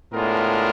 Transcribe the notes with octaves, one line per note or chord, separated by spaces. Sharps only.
A2 G#3 B3 D4 F4 A#4